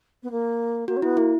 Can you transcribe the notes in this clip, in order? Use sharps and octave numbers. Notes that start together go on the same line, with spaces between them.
B3
A#3
A#3 F#4
C#4
B3 E4
A#3 E4